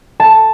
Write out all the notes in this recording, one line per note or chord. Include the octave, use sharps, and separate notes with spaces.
A5